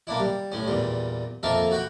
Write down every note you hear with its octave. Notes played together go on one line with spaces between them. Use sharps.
A#3 D4 E4
G3
A2 C#4
E2 A#2 G3
F2 A#3 A4 E5 F5
F#4 F#5 G5 B5